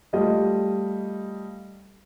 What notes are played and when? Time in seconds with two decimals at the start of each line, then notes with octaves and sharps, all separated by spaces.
0.13 G3 A3 F4 D#5 F5